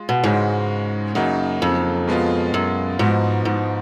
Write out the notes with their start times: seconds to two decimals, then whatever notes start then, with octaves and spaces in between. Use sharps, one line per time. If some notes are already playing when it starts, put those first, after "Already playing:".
Already playing: G#3 F4
0.09 B2
0.24 G#2 C#3 G#3 C#4 F#4
1.15 F#2 C#3 F#3 A#3 D#4
1.62 F2
2.07 B2 G#3 B3 F4
2.54 F#2
2.99 G#2 F3 B3 D#4 F#4
3.45 G#2